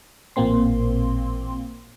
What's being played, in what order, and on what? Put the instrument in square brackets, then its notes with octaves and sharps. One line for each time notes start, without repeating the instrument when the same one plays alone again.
[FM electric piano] A1 A#2 A#3 C4 C6